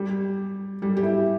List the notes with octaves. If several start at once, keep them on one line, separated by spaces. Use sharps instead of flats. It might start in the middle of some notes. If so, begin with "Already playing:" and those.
Already playing: G3
G3
G4
E4